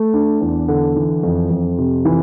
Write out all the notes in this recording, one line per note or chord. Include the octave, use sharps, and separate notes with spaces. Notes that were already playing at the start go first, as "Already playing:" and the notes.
Already playing: A3
D4
E2
D3
E3
F2
F2
C3
E3